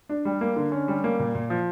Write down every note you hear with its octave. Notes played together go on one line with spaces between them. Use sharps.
D4
G3
A#3
D3
C#4
G3
A#3
A#2
A#2
F3